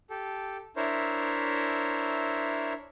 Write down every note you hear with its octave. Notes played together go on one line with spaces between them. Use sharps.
G4 A4
D4 E4 A#4 C5 C#5 E5